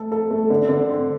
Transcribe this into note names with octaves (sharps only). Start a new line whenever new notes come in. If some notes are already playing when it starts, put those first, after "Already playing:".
Already playing: A3 A4
A4
A3
D3
D3
C4